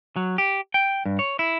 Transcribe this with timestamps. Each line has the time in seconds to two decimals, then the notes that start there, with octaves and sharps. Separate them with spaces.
0.16 F#3
0.38 G4
0.74 G5
1.05 G2
1.19 C#5
1.39 E4